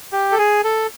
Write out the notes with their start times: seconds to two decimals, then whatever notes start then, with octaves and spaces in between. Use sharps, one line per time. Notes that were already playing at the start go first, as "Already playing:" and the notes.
0.12 G4
0.32 A4
0.39 G#4
0.64 A4